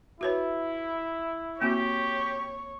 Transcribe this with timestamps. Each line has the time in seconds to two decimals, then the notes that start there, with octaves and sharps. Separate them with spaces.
0.21 E4 F#4 B4 C#5
1.62 A#3 C4 F#4 G4 C#5